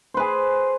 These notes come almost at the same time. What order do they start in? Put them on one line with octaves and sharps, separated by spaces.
C5 B4 G#4